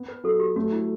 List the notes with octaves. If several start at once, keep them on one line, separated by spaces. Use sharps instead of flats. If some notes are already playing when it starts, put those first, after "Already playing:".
Already playing: B3
B4
F#3 A4
G4
A3 F#4
E4